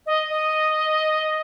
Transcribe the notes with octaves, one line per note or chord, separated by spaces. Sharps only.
D#5
D#5